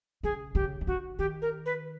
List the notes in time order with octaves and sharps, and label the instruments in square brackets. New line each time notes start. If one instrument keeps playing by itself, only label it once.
[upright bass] C#3 [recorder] G#4
[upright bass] C#3 [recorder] G4
[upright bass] D#3
[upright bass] D3 [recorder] F#4
[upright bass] D#3 [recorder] G4
[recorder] A#4
B4